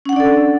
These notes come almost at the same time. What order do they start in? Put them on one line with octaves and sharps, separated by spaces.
C#4 F#5 D4 D5 A4